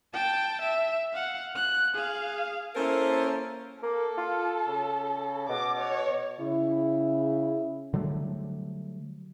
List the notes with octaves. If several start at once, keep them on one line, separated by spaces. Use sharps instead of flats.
G5 A5
E5
F5 F#5
F#6
G#4 F5
A#3 C#4 E4 A4 A#4 C5
A#3 A4
F4
C#3
B2 D6
C#5
C#3 E4
D3 F#3 G3 A3